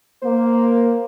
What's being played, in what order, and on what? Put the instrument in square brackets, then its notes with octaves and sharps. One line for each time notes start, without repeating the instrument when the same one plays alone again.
[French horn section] A#3 [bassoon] C5